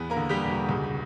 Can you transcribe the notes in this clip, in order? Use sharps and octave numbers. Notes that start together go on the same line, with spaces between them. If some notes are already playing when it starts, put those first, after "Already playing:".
Already playing: E2 B3 B4
A#3 A#4
D3
G3 G4
E1
F#4
C#2